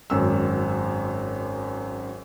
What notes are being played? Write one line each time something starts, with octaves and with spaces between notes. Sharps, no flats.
G#1 F#2 E6